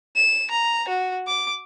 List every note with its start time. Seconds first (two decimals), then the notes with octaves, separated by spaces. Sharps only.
0.16 E7
0.51 A#5
0.88 F#4
1.27 D6